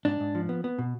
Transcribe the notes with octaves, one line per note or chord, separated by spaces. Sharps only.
G#2 D4
G#2
F3
B3
B3
B2